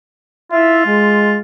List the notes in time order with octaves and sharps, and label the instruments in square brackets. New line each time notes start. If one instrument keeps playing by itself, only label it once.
[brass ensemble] E4 E5 [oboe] F4
[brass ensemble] G#3